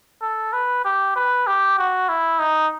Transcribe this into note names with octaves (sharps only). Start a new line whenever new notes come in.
A4
B4
G4
B4
G4
F#4
E4
D#4